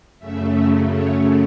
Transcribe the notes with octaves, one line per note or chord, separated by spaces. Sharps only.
F#2 C#3 A3 E5
C#5